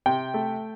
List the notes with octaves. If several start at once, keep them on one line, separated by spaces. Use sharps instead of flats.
C3 G5
A3